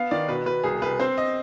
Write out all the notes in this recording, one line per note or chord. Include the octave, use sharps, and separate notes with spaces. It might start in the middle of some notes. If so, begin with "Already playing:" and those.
Already playing: B3 F5
D#3 D5
B2 B4
B2 B4
C2 G#4
C2 B4
C4 C5
D#5